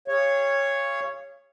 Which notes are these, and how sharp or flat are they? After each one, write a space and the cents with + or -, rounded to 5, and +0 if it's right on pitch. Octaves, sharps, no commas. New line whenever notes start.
G#4 -45 C#5 +0 F5 -30